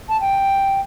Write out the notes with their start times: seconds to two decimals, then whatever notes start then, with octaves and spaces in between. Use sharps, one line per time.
0.09 A5
0.21 G5